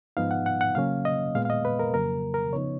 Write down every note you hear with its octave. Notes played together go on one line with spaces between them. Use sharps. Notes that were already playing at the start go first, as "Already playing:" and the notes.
G#2 F3 B3 D#4 F5
F#5
F#5
F#5
C#3 F#3 A#3 C#4 F5
D#5
A#2 G#3 B3 F5
F5
D#5
B4
A#4
F2 C#3 F#3 A#3 A#4
A#4
C#3 F3 B3 D#4 C#5